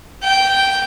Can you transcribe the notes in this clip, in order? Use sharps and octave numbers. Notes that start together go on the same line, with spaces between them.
G5